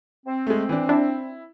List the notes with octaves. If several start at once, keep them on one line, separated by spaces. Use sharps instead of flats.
C4
G#3 A3
E3 D4
D4 E4